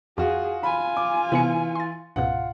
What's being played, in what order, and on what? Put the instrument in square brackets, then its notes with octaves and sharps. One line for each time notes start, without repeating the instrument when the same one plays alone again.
[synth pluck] F2 [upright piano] F4 F#4 [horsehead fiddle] G#4
[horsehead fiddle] F4 G#5 [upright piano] B5
[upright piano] D6
[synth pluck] C3 B3 [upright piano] E3 C#7
[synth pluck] C6 A6
[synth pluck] C#2 G#2 B2 [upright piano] F4 F#5